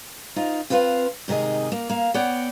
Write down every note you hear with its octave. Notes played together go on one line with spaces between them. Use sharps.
D#4 F4 C5
C4 F4 B4 C5 F5
G#2 C3 D#3 G#4 D#5
A#3
A#3 F5
B3 C#5 D5 F#5 G5